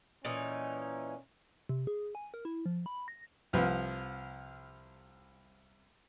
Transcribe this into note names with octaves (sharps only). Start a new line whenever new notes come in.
A#2 E3 C#4 D#4
C3
G#4
G#5
A#4
E4
F3
B5
A#6
C2 F3 B4